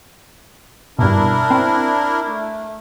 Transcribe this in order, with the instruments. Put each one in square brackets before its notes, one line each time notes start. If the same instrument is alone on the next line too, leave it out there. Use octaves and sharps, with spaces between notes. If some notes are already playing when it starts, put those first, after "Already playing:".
[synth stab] G2 B2 [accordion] D4 E4 A#4
[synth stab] C4
[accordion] A3